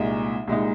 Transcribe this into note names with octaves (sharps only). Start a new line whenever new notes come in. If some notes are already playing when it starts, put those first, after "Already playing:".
Already playing: C2 A#2 G#3 D#4
C2 A#2 G#3 D#4